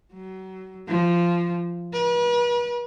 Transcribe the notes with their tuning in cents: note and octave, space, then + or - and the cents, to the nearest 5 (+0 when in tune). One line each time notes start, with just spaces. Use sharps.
F#3 +30
F3 -15
B4 -40